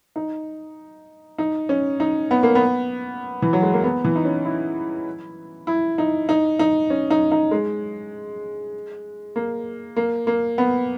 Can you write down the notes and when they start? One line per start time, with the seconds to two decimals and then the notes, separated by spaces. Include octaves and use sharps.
0.16 D#4
1.39 D#4
1.69 C#4
2.00 D#4
2.31 B3
2.43 A#3
2.55 B3
3.42 E3
3.53 F#3
3.63 G#3
3.73 A#3
3.84 B3
4.05 E3
4.16 D#4
4.25 C#4
4.45 E4
5.67 E4
5.98 D#4
6.29 D#4
6.59 D#4
6.90 C#4
7.11 D#4
7.32 D#4
7.51 G#3
9.36 A#3
9.96 A#3
10.27 A#3
10.58 B3